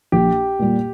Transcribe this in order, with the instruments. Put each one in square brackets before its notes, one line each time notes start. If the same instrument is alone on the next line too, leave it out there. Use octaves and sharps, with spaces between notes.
[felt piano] A#1 [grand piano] G4
[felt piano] A#2 G3